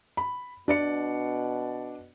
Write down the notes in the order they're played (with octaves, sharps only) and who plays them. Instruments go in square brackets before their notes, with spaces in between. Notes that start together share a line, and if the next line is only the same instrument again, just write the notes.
[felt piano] B5
[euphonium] B2 [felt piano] D4 D5 C#7